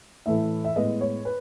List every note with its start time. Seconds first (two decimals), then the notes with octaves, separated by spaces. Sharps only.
0.26 A2 E3 A3 E5
0.65 E5
0.76 A2 G#3 B3 D#5
1.01 C#5
1.25 B4